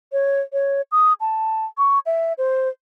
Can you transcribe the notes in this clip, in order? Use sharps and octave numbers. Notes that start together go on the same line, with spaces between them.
C#5
C#5
D#6
A5
C#6
E5
C5